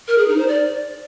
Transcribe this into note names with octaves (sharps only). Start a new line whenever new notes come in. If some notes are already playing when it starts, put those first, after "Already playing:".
A#4
G#4
D#4
C5
D5